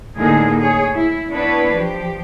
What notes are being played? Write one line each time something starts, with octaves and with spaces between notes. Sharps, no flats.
A2 D3 A#3 D#4 G#4
G#4 C#5
E4
B3 D4 E4 B4 C#5
F3 G4